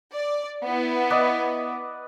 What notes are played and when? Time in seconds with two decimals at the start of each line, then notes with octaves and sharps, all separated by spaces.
0.13 D5
0.63 B3 E4
1.10 B4 D5 D#5